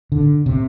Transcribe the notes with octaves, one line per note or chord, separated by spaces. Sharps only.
D3
C3